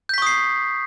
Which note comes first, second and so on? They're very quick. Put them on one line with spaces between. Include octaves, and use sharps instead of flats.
G6 B6 C#6 D#6 C7